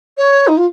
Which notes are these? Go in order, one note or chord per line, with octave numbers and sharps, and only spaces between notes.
C#5
D#4
F4